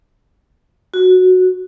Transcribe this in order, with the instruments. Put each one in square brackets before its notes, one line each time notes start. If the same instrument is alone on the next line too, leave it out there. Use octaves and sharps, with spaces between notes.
[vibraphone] F#4